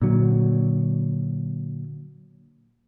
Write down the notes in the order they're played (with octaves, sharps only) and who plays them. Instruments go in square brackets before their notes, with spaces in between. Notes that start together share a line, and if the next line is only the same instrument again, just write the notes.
[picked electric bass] A#2 D3 F#3